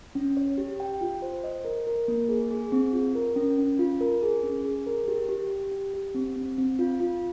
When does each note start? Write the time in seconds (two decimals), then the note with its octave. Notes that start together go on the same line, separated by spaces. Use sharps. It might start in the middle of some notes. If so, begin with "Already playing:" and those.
0.15 C#4
0.37 C#5
0.58 G4
0.80 G5
1.01 F4
1.22 C5
1.44 D#5
1.65 A#4
1.87 A#4
2.08 A#3
2.29 G#4
2.51 G#4
2.72 C4
2.93 F4
3.15 A#4
3.36 C#4
3.58 C#4
3.79 F4
4.01 A#4
4.22 G#4
4.43 C#4
4.65 G#4
4.87 A#4
5.08 G4
5.29 G4
5.50 G4
5.71 G4
5.94 G4
6.15 C4
6.36 C4
6.58 C4
6.79 F4
7.00 F4